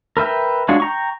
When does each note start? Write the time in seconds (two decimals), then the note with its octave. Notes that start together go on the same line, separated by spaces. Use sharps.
0.17 A#4 B4 E5 G5
0.68 F#3 G#3 D4 F4 F#4
0.80 G5 A#5 C#6